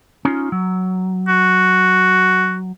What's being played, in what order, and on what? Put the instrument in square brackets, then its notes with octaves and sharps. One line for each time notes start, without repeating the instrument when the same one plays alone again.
[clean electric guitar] C#4 D#4 F4
F#3
[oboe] F#4